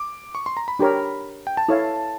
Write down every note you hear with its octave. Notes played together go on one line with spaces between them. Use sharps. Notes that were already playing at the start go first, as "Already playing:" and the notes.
Already playing: D6
C#6
C6
A#5
B5
D4 G4 A#4 C#5
G5
A5
E4 A4 C#5 F5